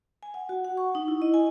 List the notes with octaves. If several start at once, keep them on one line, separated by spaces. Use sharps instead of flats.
G#5
F#5
F#4
F#5
C#6
D#4
E4
D#5
G#5